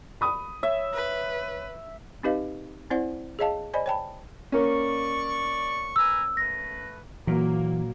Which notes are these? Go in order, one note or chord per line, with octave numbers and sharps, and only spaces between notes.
B5 D#6
C#5 E5
B4
C4 D#4 G4 B4 D#5 F5
C4 E4 C5 D5 F#5
G#4 C#5 D#5 F5 A5
C5 D5 D#5 G#5 B5
C#5 G5 A5 B5
A#3 C#4 D5 C#6
B4 G#5 A#5 E6
A3 B4 A#6
A#2 E3 F#3 A#3